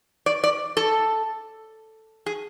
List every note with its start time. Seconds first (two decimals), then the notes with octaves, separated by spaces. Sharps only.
0.26 D5
0.44 D5
0.77 A4
2.26 G#4